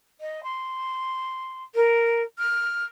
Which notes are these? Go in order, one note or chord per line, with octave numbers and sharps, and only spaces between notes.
D#5
C6
A#4
F6